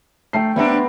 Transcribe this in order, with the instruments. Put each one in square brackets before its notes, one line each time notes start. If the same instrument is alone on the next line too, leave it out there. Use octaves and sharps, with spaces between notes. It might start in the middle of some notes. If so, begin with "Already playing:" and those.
[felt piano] A3 C7 [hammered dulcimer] G5 A#5
[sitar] G3 C4 D4 [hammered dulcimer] B3 A#5 [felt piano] E5